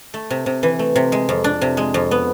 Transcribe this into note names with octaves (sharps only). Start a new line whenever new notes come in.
A3
C3
C3
E3
A3
C3
G#3
F2
D4
C3
G#3
F2
B3